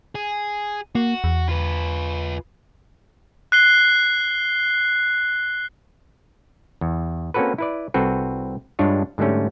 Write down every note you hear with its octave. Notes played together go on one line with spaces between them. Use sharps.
G#4
A#3 F#4
E2
F4 B4
F#6 C7 G7
E2
A#3 C4 C#4 F#4 A4 B4
E4 B4 D5
C2 C4 F#4 A4 B4
G2 G#3 D4 F4 C#5
G#2 D3 G3 A3 C#4